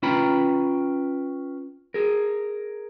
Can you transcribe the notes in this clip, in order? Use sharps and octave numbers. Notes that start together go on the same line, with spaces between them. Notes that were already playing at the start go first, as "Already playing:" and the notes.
C#4 F4 B4 G5 A#5 B5
G#4 A#4